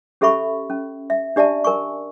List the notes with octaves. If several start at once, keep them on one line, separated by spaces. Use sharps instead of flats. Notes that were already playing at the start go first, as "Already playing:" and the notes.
C#4 G4 A4 E5 B5 C#6
C#4
E5
D4 G4 D5 E5 A5
A#4 G#5 C#6